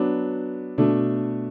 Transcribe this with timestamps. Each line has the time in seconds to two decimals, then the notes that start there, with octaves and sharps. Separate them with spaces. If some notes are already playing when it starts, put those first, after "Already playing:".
Already playing: F#3 B3 D4
0.78 B2 A3 D4